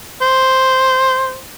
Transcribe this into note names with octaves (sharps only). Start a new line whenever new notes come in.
C5